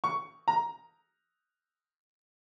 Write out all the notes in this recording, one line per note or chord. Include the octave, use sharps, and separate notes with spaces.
C#6
A#5